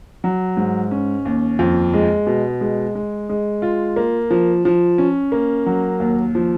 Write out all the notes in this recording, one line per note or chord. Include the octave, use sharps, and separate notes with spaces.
F#3
G#2
C#4
D#2
F2
G#3
B2
G#3
G#3
G#3
F4
A#3
F3
F3
C#4
A#3
F#3
D#2
F3